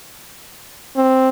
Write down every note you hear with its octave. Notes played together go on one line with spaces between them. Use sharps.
C4